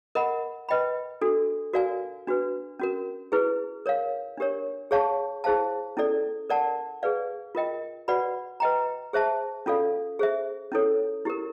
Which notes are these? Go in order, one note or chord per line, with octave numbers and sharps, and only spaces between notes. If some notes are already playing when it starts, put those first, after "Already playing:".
A#4 D#5 F#5 B5
B4 D#5 G5 B5
D4 F#4 A4
F#4 A#4 D5 F5 G#5
D4 F#4 B4
C#4 F#4 A#4
E4 G#4 B4
A#4 C#5 F5
D4 G4 A#4 C#5
G#4 C#5 F5 A5 C#6
E4 G#4 C5 F5 A5
C#4 E4 A4 D5
A#4 D5 F#5 A5
G#4 B4 D5 F5
F4 A#4 D#5 G5
F#4 B4 D5 F#5 B5
B4 D#5 G5 A#5
G#4 C5 E5 A5
C#4 F4 A4 D5 F5
G#4 C5 E5
C#4 E4 A4 C#5
E4 G4 A#4